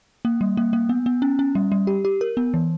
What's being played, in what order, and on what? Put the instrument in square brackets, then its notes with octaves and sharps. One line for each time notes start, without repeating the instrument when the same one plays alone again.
[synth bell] A#3
G3
A#3
A#3
B3
B3
C#4
C#4
G3
G3
G4
G4
A#4
B3
E3